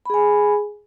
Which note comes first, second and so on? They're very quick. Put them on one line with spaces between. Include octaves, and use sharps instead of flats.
B5 G#4 G#5